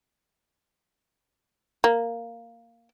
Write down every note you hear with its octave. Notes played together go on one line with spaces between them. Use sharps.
A#3